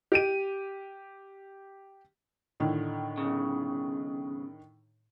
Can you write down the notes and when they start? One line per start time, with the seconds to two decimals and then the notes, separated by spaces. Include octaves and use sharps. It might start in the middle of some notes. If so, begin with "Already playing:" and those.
0.12 G4 D7 D#7
2.60 A2 D3 D#3
3.18 B1 C#3